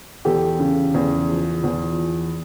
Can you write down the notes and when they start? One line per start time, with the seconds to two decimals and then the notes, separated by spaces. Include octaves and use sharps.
0.25 E2 G4 A4
0.59 C#3
0.94 E2
1.29 F3
1.64 E2